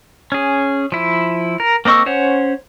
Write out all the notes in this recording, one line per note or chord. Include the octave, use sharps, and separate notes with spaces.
C#4 G#4
F3 E4
A#4
A#3 C4 D#5 C#6 E6
C#4 C5 C#5 F#5